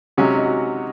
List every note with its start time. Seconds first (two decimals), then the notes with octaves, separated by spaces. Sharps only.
0.17 C3 F#3 G#3 C#4 G#4
0.34 D#4 D#5
0.43 F#4 F#5